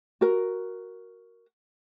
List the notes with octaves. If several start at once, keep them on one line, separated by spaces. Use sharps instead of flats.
F#4 A#4